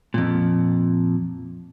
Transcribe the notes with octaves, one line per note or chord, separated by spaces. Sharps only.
F2 A#2